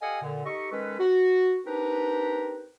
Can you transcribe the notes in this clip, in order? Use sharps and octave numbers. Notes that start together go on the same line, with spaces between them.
G4 A4 D#5 F5 F#5 G#5
A#2 D3
D#4 G4 A4 D#5 C#6
D#3 G#3 C#4 A4 B4
F#4
C4 D4 D#4 G4 A#4 B4